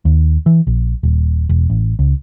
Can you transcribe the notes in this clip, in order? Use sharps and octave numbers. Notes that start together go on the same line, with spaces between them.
D#2
E3
A#1
D#1
E1
A1
C#2